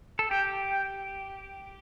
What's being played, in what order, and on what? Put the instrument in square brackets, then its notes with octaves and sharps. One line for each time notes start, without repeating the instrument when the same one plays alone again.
[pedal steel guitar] A4
[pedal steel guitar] G4 [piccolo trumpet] G5
[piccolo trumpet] G5